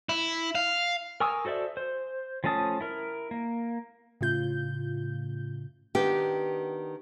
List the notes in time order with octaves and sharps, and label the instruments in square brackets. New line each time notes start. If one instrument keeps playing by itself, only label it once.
[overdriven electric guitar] E4
F5
[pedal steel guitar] A#4 G#5 C#6 D#6 E6
F#4 A4 C5 D5 E5
C5
F3 A3 C#4 A5 D#6
E4 A#4
A#3
[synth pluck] A2 C#3 F4 G6
[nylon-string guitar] D#3 B3 D4 G4